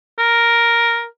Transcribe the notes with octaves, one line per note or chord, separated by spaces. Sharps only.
A#4